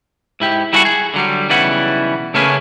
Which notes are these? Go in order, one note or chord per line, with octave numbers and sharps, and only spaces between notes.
G#2 E4 G4
G3 E4 F#4 G#4 A4 F#5
G#4
D3 F#3 G3
B1 C#3 E3 G3 E4 F#5
C#3 A3 A#3 C#4 G#4 B4